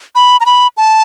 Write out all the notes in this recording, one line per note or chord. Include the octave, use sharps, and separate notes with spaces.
B5
A#5
B5
A5